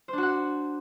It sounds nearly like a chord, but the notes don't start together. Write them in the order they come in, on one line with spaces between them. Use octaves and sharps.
C5 D4 F#4 F#5